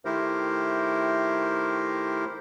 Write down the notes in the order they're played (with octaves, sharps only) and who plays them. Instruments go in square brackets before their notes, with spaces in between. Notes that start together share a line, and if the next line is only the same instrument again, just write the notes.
[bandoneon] D#3 A3 E4 G4 A#4 C5